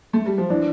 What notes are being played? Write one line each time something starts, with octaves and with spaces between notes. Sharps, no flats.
A3
G3
F3
E3 D4